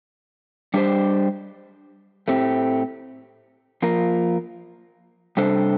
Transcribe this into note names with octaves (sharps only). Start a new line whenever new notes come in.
G3 D4 G4 C5
A2 A3 C4 G4
F3 A#3 F4 A#4
C3 G3 D4 A4 C5